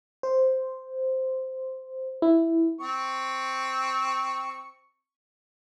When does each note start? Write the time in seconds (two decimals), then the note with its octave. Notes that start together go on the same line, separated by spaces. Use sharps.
0.23 C5
2.22 E4
2.80 C4 C#6